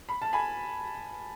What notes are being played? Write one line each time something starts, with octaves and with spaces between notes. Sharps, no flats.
B5
A5
G#5 B5